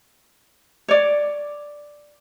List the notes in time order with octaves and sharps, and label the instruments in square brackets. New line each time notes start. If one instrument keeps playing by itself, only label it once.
[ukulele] C#5 D5